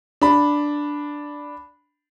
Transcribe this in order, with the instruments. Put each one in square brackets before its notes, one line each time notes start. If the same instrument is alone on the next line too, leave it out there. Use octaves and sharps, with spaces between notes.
[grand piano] D4 B5